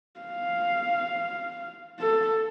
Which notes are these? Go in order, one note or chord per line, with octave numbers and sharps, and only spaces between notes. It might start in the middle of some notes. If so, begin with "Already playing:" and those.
F5
A4